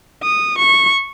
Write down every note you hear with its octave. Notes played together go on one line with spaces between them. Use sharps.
D#6
C#6